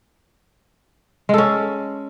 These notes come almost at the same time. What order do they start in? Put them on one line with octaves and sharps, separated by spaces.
G#3 A4 C#4